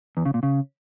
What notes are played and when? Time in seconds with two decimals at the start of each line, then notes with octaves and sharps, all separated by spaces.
0.17 E2
0.25 C#3
0.34 A#2
0.43 C#3